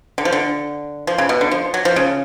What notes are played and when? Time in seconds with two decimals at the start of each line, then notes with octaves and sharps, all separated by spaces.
0.18 D3
0.25 F3
0.33 D3
1.07 F3
1.18 C#3
1.29 B2
1.41 D3
1.51 F3
1.74 F#3
1.85 F3
1.96 C#3